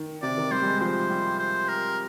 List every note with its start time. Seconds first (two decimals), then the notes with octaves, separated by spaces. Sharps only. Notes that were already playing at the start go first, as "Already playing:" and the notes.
Already playing: D#3
0.22 C3 D5
0.37 D#3
0.51 G3 C5
0.62 G3
0.66 G#3
0.80 F3 C5
1.10 G3
1.39 C5
1.69 A#4